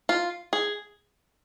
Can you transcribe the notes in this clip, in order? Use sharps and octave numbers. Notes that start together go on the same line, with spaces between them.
F4
G#4